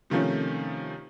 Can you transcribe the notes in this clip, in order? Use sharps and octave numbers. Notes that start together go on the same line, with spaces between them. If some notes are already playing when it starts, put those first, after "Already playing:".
C3 D#3 F3 A3 C#4